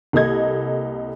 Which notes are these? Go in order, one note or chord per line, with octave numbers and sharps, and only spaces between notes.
C2 A#3 A4 D#5 G#6